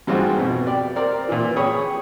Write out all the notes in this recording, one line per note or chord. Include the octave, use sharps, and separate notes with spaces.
G#2 G3 G#3 C4 F4 F#4
F2 B2
G4 D5
C4 A#4 D5
A#2 E3
G4 G#4 C#5 B5 D#6